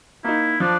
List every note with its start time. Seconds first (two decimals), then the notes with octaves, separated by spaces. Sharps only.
0.24 A#3 D#4 E4
0.60 F3 D4